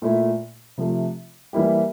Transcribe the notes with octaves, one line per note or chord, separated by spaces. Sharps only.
A#2 A3 E4
C3 F3 A3
E3 G3 A#3 E4 G4